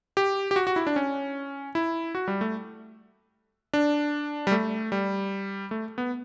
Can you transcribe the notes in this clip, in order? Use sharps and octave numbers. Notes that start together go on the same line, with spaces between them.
G4
G4
F#4
F#4
E4
D4
C#4
E4
F#4
G3
A3
D4
G3
A3
G3
A3
B3